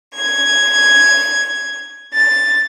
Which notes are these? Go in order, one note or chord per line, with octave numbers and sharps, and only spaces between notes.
G#6
A6